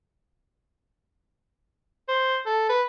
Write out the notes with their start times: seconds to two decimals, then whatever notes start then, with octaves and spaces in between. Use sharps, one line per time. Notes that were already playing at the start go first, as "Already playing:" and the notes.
2.08 C5
2.46 A4
2.69 B4